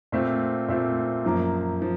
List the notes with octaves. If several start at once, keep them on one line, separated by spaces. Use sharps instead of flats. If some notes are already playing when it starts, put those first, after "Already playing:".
A#2 A3 C4
A#2 A3 C4
F#2 F3 A#3
F3